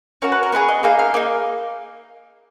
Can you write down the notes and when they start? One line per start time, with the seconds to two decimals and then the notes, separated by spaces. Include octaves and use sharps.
0.22 C#4 F#4 A#4
0.32 B4
0.43 A#4
0.52 B3 F4 G#4 B4
0.68 D#5
0.83 A#3 D#4 G#4 F5
0.99 F5
1.14 A#3 D#4 D#5